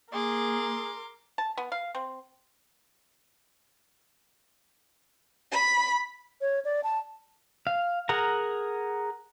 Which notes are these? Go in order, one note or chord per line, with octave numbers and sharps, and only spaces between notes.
A#3 G#4 A#4 C6 D6
A5
B3
F5
C4
B5
C#5
D5
A5
F5
G#4 A#4 F#5 A#5